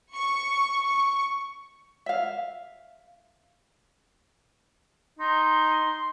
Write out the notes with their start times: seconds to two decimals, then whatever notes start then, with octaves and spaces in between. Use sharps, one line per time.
0.15 C#6
0.85 C#6
2.06 E5 F5
5.19 D#4 C6